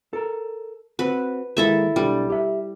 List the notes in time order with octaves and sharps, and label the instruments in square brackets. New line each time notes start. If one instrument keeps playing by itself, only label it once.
[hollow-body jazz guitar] A4 A#4
[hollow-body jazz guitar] C4 F#4 [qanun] B4
[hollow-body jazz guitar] D#3 G#3 A#3 [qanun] E4 A4 E5
[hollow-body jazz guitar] B1 D4 A4 [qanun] G3
[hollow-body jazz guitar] G4 E5